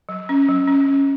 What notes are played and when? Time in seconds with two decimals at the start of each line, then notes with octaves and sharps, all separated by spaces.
0.09 F#3
0.29 C#4
0.48 F#3
0.67 C#4
0.86 C#4